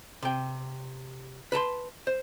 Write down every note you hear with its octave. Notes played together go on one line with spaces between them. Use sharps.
C3 G5
B4 A5 A#5 C6
C5